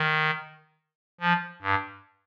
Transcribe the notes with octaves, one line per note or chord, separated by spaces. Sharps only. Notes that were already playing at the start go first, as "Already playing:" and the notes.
Already playing: D#3
F3
G2